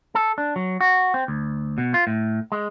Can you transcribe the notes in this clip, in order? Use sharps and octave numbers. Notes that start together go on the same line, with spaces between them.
A4
D4
F#3
F#4
C4
D2
B2
F4
A2
G#3